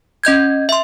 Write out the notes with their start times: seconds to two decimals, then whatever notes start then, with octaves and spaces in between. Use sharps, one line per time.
0.24 C#4 D#5 G6 G#6
0.69 E5 C6